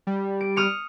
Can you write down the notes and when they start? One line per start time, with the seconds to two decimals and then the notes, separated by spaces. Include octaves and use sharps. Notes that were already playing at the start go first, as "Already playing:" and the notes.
0.07 G3
0.41 D7
0.56 D#6 F6 C#7